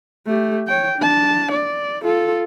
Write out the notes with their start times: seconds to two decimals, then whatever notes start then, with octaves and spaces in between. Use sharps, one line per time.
0.26 A3 G4
0.68 C#5 G5
0.99 D4 A5
1.52 D5
2.04 F4 A4